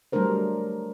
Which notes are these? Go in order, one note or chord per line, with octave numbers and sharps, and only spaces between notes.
F#3 G3 A3 D4 A#4 C5